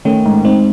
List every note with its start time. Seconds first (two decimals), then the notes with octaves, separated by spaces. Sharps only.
0.05 D#3 A3 C#4
0.26 G#2
0.44 G#2 C4 D#4